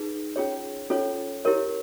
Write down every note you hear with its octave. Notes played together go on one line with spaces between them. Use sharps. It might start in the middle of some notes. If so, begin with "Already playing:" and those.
Already playing: D#4 G#4 B4
C#4 F4 G#4 C#5
C#4 F4 A4 C#5
E4 G4 A#4 C#5